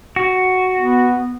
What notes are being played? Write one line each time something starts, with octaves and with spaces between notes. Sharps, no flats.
F#4
B3